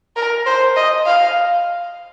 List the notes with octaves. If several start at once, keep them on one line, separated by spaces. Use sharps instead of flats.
A#4
C5
D#5
F5